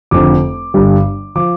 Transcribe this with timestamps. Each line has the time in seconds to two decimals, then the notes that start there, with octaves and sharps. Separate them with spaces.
0.11 F1 F2 D3 D6
0.74 G1 G2 G3
1.35 F3 D6